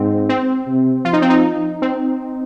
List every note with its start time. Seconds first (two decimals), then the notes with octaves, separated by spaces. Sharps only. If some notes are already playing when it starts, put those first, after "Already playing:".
Already playing: G#2 C4
0.29 C4
0.67 C3
1.05 F3 F4
1.13 D#4
1.22 C4
1.30 D#4
1.82 C4